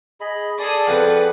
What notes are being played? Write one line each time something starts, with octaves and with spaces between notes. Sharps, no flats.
G#4 D#5 B5
G#4 A4 D5 D#6
F2 B4 F#5